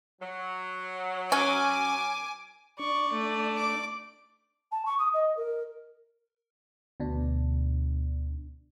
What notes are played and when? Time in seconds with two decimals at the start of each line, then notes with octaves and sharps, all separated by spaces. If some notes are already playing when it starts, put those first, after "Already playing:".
0.21 F#3
1.32 C#4 G#5 D6
2.79 D4 D5 C#6
3.12 A3
3.57 D6
4.72 A5
4.85 C#6
4.98 D#6
5.13 D#5
5.36 A#4
7.00 D2 B2 D4